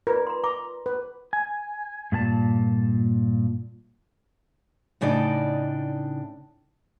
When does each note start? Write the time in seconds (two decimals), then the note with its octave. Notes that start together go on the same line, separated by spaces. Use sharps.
0.07 F4 A#4 B4 D5
0.27 A#5 C6
0.44 A#5 D6
0.86 B4
1.33 G#5
2.12 G2 A#2 G#5 A5
5.01 A2 C#3 D4 D#4 D5 D#5